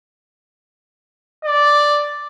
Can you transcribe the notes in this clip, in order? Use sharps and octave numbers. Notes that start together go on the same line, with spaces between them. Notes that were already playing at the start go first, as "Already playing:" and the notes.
D5